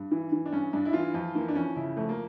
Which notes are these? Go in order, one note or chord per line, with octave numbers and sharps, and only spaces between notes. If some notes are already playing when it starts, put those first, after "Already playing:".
Already playing: G2
E3
E3
D4
G2 C#4
G2 D4
E4
E3 F4
F2 F4
E3 A#3
D4
F2 C#4
C#3 E4
F2 A3
A#3